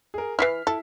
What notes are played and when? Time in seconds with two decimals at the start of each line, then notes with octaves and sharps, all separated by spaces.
0.14 G#4 A#4
0.39 E3 D#4 E4 F6 B6 C7
0.67 E4 A4